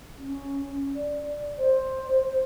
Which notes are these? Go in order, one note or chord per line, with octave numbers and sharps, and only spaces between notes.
C#4
D5
C5